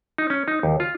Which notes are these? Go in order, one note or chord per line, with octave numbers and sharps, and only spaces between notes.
D#4
C#4
D#4
D#2
F4